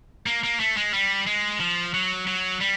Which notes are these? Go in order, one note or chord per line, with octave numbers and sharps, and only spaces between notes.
A#3
A#3
A3
G#3
G3
G#3
F3
F#3
F#3
G3